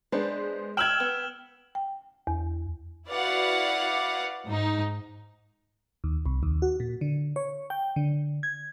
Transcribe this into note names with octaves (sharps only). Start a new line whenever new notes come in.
G#3 B3 D4 C5
G5 E6 F6 G#6 E7 F#7
B3
G5
E2
E4 F#4 B4 D5 F5 F#5
G#2 D#4
D#2
C2
D#2
F#4
A#2
D3
C#5
G5
D3
G#6